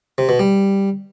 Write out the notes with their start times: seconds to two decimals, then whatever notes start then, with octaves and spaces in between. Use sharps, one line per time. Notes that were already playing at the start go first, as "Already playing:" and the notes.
0.18 C3
0.29 B2
0.39 G3